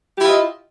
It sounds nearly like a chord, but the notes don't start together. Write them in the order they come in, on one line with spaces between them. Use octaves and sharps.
G4 E4 F4 D#5